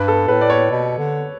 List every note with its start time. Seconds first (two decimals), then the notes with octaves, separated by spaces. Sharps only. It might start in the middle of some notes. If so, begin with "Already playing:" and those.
Already playing: G2 B4
0.08 A4
0.28 A2 B4
0.41 D5
0.50 C#5
0.71 B2
0.98 D3